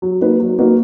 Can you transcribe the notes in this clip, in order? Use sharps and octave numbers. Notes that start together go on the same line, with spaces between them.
F#3
A#3 D#4 F#4 B4
F#3
A#3 D#4 F#4 B4